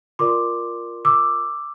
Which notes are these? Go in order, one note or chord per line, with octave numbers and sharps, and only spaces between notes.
F4 A#4 D5 C6 D6
D6 E6